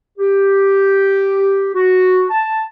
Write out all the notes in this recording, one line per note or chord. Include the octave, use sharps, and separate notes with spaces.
G4
F#4
A5